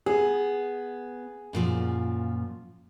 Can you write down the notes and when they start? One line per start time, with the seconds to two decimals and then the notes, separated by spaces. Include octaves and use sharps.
0.06 B3 G#4
1.53 F#2 A#2 F3